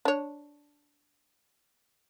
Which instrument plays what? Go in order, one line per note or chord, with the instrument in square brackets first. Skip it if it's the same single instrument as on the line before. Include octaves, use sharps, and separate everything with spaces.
[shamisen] D4 C#5